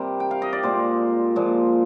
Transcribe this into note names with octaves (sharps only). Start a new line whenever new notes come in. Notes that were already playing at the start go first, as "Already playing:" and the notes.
Already playing: C3 G3 A#4 C5
G5
F5
D#5
D5
A#2 G#3 C5
A#2 F3 G#3